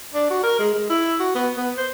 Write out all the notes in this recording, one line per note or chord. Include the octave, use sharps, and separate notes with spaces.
D4
F#4
A#4
G#3
G#3
E4
F#4
B3
B3
C5